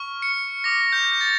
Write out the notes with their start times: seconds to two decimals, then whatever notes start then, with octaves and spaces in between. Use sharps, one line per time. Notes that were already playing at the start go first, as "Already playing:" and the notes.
Already playing: C#6 F6
0.22 C#7
0.64 D6 F6 A#6
0.92 G6
1.21 A6